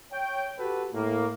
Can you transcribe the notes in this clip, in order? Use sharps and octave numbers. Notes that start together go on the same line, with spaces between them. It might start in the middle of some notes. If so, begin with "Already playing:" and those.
C#5 G5
F#4 G4 A4 B4
A2 A#3